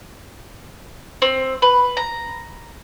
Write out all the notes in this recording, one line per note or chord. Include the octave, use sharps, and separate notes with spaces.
C4
B4
A#5